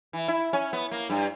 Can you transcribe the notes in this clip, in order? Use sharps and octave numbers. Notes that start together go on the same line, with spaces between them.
E3
E4
C#4
B3
A#3
G2